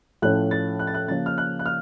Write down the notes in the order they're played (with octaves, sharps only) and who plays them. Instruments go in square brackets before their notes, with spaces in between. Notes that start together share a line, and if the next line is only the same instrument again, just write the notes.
[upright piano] A2 F3 A3 C#4 F#6
A6
F#6
A6
F#6
C#3 F3 A#3 C#4 A6
F6
F#6
F#6
F6